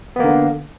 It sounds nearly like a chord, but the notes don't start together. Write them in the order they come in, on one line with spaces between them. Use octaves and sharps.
B3 A#3 D3